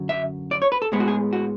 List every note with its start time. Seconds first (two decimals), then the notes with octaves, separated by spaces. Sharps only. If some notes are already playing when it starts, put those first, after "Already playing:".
Already playing: F#2 D3 F#3
0.09 E5
0.51 D5
0.62 C#5
0.72 B4
0.82 A4
0.92 A2 G#3 B3 G#4
1.00 F#4
1.08 G#4
1.33 F#4